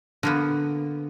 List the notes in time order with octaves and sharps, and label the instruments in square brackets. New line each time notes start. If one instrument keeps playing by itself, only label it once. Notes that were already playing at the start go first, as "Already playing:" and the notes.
[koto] D3 A#3 B3